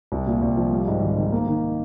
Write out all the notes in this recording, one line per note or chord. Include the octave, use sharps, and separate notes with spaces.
C2
A#2
C2
F3
G3
G#2
G#1
D#3
A#3
D#3